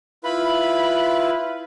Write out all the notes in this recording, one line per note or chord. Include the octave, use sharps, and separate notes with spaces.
E4 F4 B4 B5